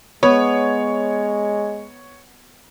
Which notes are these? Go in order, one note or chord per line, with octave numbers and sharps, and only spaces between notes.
G#3 B3 C#5